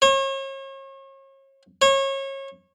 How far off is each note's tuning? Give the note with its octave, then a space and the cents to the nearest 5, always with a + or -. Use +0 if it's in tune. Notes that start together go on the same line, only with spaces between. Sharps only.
C#5 -40
C#5 -30